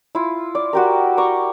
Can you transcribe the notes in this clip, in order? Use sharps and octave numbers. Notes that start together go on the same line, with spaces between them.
E4 F4
D5
F#4 G4 A#4
D5 G5 A#5 C#6